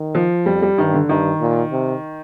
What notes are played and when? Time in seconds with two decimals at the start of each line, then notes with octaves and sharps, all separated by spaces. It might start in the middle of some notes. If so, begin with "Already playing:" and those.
Already playing: D#3
0.15 F3
0.46 F2 G3
0.62 G3
0.78 G2 D#3
0.93 D3
1.09 G2 D#3
1.41 A#2
1.72 C3